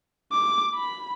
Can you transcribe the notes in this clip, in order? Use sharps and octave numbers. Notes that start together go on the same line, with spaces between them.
D6
B5